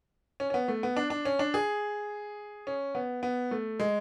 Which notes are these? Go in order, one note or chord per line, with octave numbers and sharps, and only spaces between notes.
C#4
C#4
B3
A3
B3
D4
D4
C#4
D4
G#4
C#4
B3
B3
A3
G#3